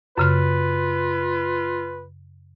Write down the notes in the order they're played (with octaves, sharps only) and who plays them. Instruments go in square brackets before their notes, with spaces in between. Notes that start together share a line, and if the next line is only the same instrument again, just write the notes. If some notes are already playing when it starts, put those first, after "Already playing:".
[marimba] F#2 C#3 F6 [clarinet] F4 [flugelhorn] B4